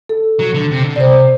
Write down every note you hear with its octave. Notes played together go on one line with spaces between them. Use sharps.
A4
F#3
D3
C3
D3
C3 C5 D5